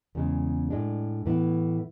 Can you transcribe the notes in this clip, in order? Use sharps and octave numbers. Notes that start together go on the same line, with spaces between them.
E2 C#3 G#3
A2 G#3 D4
A2 E3 B3 E4